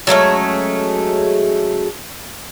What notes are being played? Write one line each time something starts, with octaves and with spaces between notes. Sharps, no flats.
F#3 G#3 A3 C#4